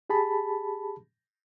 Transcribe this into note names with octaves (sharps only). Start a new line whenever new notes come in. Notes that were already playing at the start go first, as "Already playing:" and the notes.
G4 G#4 A5 B5